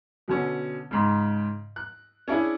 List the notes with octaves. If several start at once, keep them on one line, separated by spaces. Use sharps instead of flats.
B2 D3 C#4
G#2 C#3
F#6
C#4 D4 E4 G#4